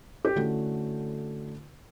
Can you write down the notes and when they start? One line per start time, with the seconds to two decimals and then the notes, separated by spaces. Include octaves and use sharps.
0.25 G4
0.36 D3 A3 C#4 E4 F#4